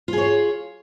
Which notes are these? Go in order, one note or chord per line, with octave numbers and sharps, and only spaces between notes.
F4 G#4 C#5